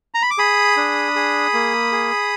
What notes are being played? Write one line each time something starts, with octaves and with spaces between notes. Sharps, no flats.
A#5
B5
D6
G#4 B5 D#6
D4
G#4
A#3
G#4